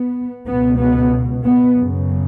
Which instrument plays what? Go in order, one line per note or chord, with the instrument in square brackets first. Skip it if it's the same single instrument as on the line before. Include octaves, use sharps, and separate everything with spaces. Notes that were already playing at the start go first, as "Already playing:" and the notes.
Already playing: [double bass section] B3
C#2 B2 B3
B3
B3
F#2 C#3